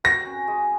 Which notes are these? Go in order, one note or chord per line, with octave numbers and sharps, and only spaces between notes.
F#4 A#6
C#4
G#3